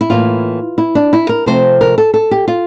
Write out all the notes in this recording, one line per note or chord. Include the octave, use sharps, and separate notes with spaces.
E4
A2 E3 A#3 F4
E4
D4
E4
A#4
C3 F3 A3 C4 C5
A#4
A4
A4
G4
F4